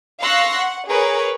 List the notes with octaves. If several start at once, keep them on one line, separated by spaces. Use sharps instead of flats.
F5 C6 C#6 E6 F#6 A#6
F#5
G#4 A#4 B4 C#5